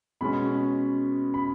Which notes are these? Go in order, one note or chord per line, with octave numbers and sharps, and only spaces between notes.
B2 G#3 C#4 B5
B5